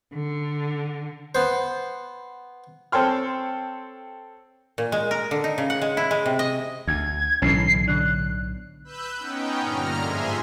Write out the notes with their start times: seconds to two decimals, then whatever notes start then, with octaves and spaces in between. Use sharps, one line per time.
0.14 D3
1.35 B3 C5
2.92 C4 A4 C#5 G5 C6 F6
4.78 A#2
4.92 G#3
5.11 A#4
5.31 D3
5.44 D#4
5.58 C#3
5.70 F#5
5.82 G#3
5.97 E4
6.11 G#3
6.26 C3
6.39 D#5
6.87 D2 G#6
7.42 B1 A2 D3 E3 C#4 C7
7.88 D3 D4 F#6
8.85 B4 E6 F#6 G6
9.16 B3 C#4 D#4 G5
9.60 G2 A#2 D3 A#5 F6
10.01 G#2 F3 G#4 E5 G#5 C6